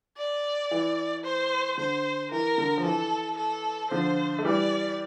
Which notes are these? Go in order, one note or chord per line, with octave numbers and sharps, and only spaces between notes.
D5
E3
C5
D3 C5
E3 A#4
D3
F3
E3 A4
A4
D3 F3 C5
A3
E3 G3 D5